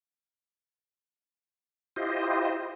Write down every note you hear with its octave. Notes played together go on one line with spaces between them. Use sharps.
E4 F4 G4 C5 D#5